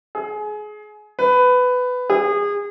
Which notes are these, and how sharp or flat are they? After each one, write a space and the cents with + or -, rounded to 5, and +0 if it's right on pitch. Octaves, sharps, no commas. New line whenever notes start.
G#4 +25
B4 +15
G#4 -30